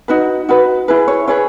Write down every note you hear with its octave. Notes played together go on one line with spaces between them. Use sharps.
D#4 F#4 B4
D#4 F#4 B4
E4 G#4 B4
C#5
E4 G#4 B4 C#5